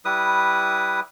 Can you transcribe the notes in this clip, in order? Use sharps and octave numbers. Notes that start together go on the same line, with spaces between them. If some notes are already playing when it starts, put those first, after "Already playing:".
G3 E4 B4 D#6